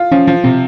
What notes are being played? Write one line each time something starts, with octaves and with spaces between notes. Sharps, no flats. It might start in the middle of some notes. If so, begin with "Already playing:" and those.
Already playing: F4
F3 C#4
F3
C3 C4